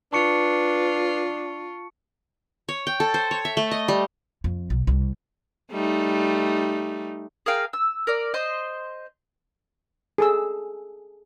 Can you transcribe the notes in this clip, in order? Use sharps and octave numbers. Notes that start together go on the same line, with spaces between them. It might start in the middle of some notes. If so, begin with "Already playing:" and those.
D4 F4 B4 A5 C#6 C#7
C#5
G5
A4
C5
C#5
E5
A3
D#5
G3
F2
B1
C2
G3 A3 D#4
G#4 A#4 F5 G5
E6
A#4 D5
C5 D#5 C6
G#4 A4 E6